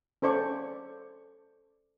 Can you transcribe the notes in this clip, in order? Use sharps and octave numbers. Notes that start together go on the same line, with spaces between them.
C#4 A4 C5 D5 C#6